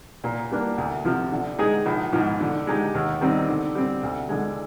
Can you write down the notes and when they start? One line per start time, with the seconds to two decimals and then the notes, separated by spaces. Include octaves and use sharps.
0.24 A#2
0.51 G3 A#3 D4
0.78 D2
1.04 C3 F3
1.32 D3
1.59 G#3 D#4 G#4
1.86 A#1
2.13 G#2 F3
2.40 D3
2.67 G#3 D#4 G4
2.95 D#2
3.21 D#3 G3 C4 D#4
3.48 D3
3.75 G3 C4
4.03 D2
4.29 D3 G#3